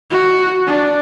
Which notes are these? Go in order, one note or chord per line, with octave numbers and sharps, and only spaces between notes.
F#4
D4